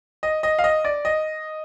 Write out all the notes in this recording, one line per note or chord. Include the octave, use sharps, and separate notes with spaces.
D#5
D#5
F5
D#5
D5
D#5